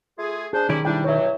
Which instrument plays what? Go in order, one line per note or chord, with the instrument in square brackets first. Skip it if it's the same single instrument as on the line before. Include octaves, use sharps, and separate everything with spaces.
[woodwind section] A3 F4 G#4
[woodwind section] D4 C5 [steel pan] G#4
[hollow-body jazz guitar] B1 D#3 D5 [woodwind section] G3 C#4 E4
[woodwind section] G3 D4 [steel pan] E4 G5
[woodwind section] G2 B2 F#3 [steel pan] C#5 E5